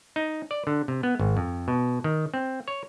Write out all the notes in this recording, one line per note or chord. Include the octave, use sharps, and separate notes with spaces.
D#4
D5
D3
C3
B3
G#1
F2
B2
D#3
C4
C#5